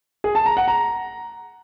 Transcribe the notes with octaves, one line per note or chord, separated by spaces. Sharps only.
G#4
A5
A#5
F#5
A#5